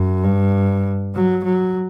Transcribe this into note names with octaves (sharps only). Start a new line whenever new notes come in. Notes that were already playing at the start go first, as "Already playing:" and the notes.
Already playing: F#2
G2
F#3
F#3